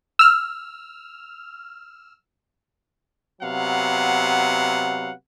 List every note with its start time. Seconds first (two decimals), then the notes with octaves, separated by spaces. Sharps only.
0.19 E6 F6
3.42 C3 F#3 B3 F5 F#5